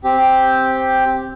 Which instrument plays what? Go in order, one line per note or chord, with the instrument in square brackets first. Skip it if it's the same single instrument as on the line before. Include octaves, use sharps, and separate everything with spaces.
[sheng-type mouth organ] C4 G4